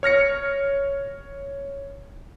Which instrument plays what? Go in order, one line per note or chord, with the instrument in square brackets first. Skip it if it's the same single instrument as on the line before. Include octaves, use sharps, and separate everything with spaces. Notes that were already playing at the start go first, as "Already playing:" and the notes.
[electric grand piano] C#5 F6 A#6 C#7